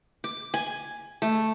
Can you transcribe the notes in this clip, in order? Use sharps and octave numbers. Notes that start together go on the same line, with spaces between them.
D6
G#5
A3